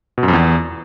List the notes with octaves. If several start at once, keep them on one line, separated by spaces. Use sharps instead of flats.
B2
F#2
F2
E2